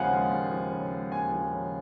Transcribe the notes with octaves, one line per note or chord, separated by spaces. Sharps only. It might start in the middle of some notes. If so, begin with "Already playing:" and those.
Already playing: D#2 C#3 F3 G#3 F5 F#5 G#5
G#3
D#2
F3
C#3
G#3
D#2 G#5
F3
C#3